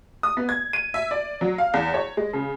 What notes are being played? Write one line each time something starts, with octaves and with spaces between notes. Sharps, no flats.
D#6
B3
G#6
D#7
E5
D5
F#3
F5
E2
C#5
G#3
C#3